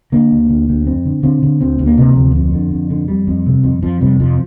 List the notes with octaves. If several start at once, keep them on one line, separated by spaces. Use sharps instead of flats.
D3 A#3
D2
D2
D2
F2 C4
D3
D3 C4
D3
D2 C4
D2
A#3
C3
D2 F3
F2
D3
F2
D3
F2 G3
F2
C3
F2
F2 F3
C3 G3
F2 F3